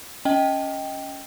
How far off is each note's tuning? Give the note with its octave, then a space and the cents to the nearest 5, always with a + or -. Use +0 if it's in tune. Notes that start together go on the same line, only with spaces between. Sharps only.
C#4 +0 D#5 +15 G5 +0